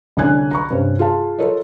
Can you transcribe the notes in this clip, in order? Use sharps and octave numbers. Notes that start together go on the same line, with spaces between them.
C2 D3 C#4 G#5 F#6 G#6
A#5 B5 C#6
G2 C3 C#4
F4 G#4 F5 A5
F4 A4 A#4 C#5 D#5